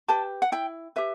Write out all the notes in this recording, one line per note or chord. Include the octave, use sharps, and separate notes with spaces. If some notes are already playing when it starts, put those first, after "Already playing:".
G4 B4 A5
F#5
E4 G5
G4 B4 E5